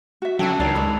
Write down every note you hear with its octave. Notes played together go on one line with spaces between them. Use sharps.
F#4 E5
F2 C#3 F#3 D4 G5 A5 E6 F#6
C#2 D#3 C#5 D5 A#5 C7 F7
G#3 G#4 B5